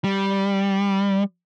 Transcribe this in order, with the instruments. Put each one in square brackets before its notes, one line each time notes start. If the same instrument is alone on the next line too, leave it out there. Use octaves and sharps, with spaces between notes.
[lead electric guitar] G3